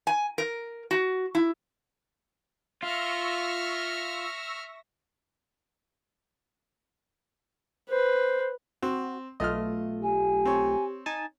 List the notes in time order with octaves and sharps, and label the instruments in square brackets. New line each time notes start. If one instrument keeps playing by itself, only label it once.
[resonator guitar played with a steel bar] G#5
A#4
F#4
E4
[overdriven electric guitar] F4 [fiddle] E5 F6 [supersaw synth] C#6 E6 A#6
[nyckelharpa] B4 [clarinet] C5
[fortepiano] C4 [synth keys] F#4
[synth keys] B1 A3 F4 [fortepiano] D#5 F6
[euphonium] G4 [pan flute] G#5
[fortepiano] C4 C#5
[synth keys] D#4 G#5 A5